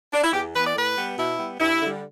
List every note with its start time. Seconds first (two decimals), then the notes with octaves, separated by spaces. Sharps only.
0.13 D4
0.23 E4
0.33 E2 G4
0.54 E3 B4
0.58 B3
0.65 D5
0.75 A2 B4
0.97 G3 B3
1.17 B2 E4
1.38 G3 B3
1.59 G2 E4
1.81 D3 G3